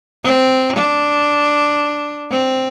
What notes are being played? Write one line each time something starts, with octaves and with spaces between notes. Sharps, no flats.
C4
D4
C4